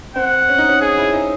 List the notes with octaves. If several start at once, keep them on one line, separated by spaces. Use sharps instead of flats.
C4 F#5
C#4
D#4
C#4
G#4
E4
D#4